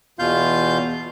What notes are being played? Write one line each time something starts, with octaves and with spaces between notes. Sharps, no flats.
E2 B2 F4 F5 G6